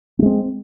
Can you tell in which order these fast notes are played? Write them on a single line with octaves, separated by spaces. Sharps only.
A#3 G#3 C4